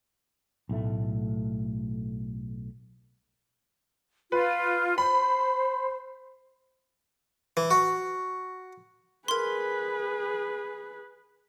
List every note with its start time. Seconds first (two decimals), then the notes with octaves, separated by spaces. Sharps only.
0.69 B1 A2 A3
4.32 F4 B4
4.98 C5 B5
7.57 E3
7.71 F#4
9.28 G#4 A#4 B4 C6